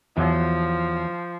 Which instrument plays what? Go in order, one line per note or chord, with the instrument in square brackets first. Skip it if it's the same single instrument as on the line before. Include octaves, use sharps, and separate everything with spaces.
[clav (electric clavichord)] E2 F#3 [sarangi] F3